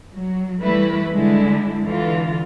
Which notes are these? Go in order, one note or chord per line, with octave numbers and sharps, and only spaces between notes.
F#3
E3 G3 A3 E4 B4
D3 G3 G#3 E4
D3 E3 F4